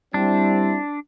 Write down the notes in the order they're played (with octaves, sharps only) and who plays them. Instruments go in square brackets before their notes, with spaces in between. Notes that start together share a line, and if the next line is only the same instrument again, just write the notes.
[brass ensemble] G3 C4 E4 [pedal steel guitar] D4